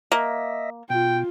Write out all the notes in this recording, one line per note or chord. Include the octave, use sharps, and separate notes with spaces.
A#3 D#5 E5
B2 F4 G5